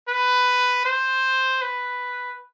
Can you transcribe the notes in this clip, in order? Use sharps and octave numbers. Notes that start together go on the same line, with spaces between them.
B4
C5
B4